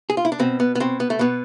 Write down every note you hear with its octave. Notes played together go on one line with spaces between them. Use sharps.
G#4
F4
E4
D4
B2 C4
B3
B3
B2 C4
B3
A3
B2 B3